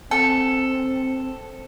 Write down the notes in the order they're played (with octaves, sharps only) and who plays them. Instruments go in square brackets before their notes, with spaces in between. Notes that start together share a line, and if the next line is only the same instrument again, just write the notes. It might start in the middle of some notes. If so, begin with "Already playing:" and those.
[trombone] C4 [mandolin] A4